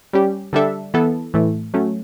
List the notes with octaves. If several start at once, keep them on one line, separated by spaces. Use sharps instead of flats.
G3 C#4 G4
D3 G3 D4 A4 E5
E3 B3 E4 A4
A2 E3 A3
F#3 A3 C#4